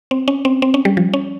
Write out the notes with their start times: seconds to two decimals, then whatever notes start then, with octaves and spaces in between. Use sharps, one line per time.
0.11 C4
0.28 C#4
0.45 C4
0.62 C4
0.74 C#4
0.85 G3
0.97 F3
1.14 C#4